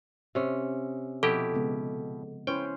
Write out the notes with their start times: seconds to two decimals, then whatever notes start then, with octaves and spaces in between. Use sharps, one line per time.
0.35 C3 C#4
1.23 B2 F3 E4 G4 A4
1.54 C#3 G#3 B3
2.47 C#4 E4 B4 C5 G5